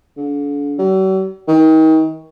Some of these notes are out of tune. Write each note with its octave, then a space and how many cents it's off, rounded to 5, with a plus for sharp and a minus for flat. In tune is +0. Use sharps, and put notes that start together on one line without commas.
D3 -40
F#3 +45
D#3 +35